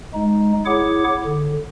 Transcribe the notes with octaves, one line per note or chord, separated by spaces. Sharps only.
G#3 D#4
E4 G#4 C#5 F#5 D6
D3